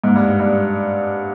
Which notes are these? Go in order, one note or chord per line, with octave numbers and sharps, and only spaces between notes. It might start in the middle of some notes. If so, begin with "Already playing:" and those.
G#2
G2
G2